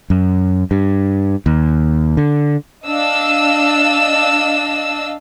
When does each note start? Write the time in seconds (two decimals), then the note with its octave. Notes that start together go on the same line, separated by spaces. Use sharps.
0.10 F#2
0.71 G2
1.46 D#2
2.17 D3
2.86 D4 D#5 F5 E6